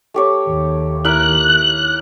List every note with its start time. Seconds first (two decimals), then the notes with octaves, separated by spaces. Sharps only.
0.14 A3 G4 C#5
0.48 D#2
1.05 E4 A#4 E5 F#6